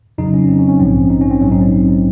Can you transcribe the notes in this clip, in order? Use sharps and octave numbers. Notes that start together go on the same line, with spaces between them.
F2 C#3 F#3 D#4
C#4
C4
C#4
C#4
A#1 G#2 F3 C4
C#4
D#4
C#4
C4
A#1 G#2 F#3 C#4
D#4
C4